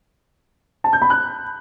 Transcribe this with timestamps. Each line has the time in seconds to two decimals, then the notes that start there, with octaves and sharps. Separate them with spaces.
0.84 A5
0.93 G6
1.02 B5
1.10 F#6